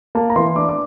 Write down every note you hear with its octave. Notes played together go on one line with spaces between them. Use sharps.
A#3 A5
A#5
E3 C6
D4 D6
D6